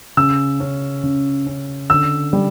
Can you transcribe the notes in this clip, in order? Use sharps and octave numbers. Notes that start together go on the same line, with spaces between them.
C#3 E6
C#4
C#3
C#4
D3 E6
G3